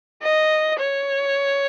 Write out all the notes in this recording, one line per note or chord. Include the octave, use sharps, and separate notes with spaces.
D#5
C#5